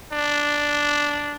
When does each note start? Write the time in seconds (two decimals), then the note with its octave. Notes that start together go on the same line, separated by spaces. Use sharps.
0.13 D4